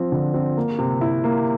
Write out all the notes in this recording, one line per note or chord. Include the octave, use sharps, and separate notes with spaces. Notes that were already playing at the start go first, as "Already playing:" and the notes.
Already playing: F3 C4
D3
C4
A#3
C3
E4
A#3